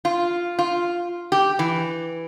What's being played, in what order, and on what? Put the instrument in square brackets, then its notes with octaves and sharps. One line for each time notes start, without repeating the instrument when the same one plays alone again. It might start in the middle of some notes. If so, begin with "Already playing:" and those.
[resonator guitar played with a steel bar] F4
F4
G4
E3